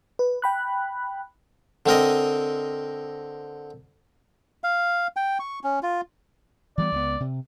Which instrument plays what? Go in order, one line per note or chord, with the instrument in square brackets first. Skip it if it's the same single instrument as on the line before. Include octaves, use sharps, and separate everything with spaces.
[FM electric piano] B4
G5 B5 F#6
[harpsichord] D3 C4 A#4 D#5
[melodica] F5
G5
C#6
C#4
F4
[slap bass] E3 G3 B3 [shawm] D5
[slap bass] C#2 A3 B3
C3